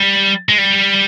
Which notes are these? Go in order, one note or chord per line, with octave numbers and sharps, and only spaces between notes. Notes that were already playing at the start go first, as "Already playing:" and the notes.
Already playing: G3
G#3
G3